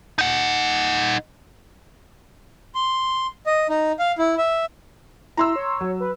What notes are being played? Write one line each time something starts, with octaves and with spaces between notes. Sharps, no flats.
D#4 F#5
C6
D#5
D#4
F5
E4
E5
E4 A#5 C6 E6
C#5
F#3
B4